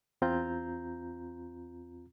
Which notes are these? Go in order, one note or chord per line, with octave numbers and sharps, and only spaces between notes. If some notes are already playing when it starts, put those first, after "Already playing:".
E2 C4 F4 A#5 G6